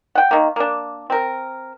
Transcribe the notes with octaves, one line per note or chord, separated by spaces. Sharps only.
F#5 G5
D#3 A#3
A#3 D4
C4 A#4